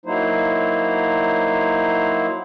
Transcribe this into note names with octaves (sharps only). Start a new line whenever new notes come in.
F#3 A#3 D#4 E4 C5